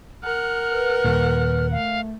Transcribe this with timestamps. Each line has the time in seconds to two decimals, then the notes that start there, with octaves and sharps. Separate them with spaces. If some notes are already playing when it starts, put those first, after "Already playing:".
0.23 A#4 F#5 F6
0.69 B4
1.04 D#2 A#2
1.71 A3 F5